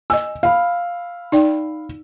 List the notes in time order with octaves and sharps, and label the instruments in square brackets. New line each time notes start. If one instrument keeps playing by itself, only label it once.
[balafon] D#5 G#5 [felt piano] E6
[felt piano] F5 B5
[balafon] D#4 D5 G5